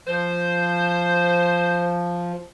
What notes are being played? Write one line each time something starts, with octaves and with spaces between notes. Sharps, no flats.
F3 C5